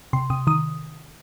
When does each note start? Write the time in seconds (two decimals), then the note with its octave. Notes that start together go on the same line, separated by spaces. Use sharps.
0.13 C3 C6
0.30 C3 D#6
0.47 D#3 D#6